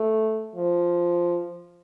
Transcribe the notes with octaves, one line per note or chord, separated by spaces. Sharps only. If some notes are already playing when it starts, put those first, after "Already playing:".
Already playing: A3
F3